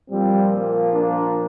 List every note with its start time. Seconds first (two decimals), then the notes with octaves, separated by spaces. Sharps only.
0.11 A#2 F3 G3 C4
0.52 A#3
0.93 A#3 D4